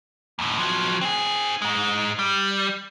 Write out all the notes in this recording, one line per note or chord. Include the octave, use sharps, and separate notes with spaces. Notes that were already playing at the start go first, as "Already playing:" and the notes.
D#2 A2
F3 F#3
C4 G#4
G#2 G#3
G3